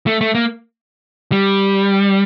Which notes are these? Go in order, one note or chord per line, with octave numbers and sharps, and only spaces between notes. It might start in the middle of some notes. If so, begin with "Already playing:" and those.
A3
A3
A#3
G3